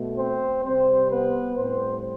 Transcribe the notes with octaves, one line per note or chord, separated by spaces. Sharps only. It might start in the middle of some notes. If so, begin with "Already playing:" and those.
Already playing: B2 A3
C4 C5
C3 G3 C4 C5
B3 B4
A2 G3 C4 C5